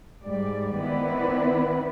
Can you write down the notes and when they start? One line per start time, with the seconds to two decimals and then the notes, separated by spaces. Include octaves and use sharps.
0.24 G#2 G3 D5
0.75 D#3 B3 C4 E4 B4 D5